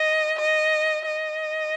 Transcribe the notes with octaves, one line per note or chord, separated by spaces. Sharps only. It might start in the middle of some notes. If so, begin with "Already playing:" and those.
Already playing: D#5
D#5
D#5